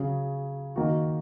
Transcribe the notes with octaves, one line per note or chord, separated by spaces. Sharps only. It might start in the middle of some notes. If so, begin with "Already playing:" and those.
Already playing: C#3 F#3 C#4 G#4
D#3 A#3 F#4